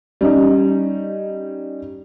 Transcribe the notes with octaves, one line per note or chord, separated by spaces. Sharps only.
G3 C#4 D#4